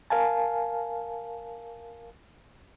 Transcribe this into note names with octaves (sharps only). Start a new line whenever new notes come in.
A#4 F5 G#5 A5